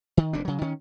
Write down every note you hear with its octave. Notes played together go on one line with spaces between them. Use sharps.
D#3
F1 E2 A#2 D4
C#3 F#3
D#3 C#4